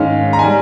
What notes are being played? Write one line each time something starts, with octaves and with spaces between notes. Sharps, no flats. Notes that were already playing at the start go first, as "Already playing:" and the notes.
Already playing: G#2 D#3 G#3 C#4 F5
A#5
G3 G#5